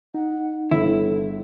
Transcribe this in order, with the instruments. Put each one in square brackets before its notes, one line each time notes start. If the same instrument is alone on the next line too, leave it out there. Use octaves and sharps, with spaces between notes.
[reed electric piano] D#4 [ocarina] F#5
[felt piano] G1 [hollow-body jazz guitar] E4 [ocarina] A4